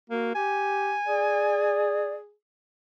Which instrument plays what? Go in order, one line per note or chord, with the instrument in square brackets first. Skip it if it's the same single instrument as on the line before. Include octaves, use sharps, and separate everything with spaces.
[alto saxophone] A#3 [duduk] F#4
[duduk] G4 [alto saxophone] G#5
[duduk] G#4 [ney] D5